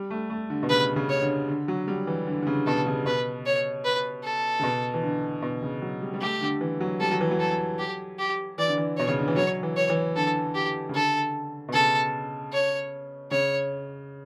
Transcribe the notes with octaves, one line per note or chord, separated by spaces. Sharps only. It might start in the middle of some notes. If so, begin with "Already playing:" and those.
Already playing: G3
A3
A3
D3
B2
C#3 B4
C#3
C#5
D3
D3
F#3
G3
E3
D3
D3
C#3
B2 A4
C#3
B2 B4
C#5
B4
A4
C#3
B2
E3
D3
B2
C#3
F#3
G3
G3
A3 G4
D3
E3
F#3
G3 A4
F#3
E3
F#3
A4
G4
G4
E3 D5
D3
E3
B2 C#5
C#3
D3
E3
F#3 C#5
E3
C#5
E3
D3 A4
G4
C#3
D3 A4
B2
C#3 A4
C#5
C#3 C#5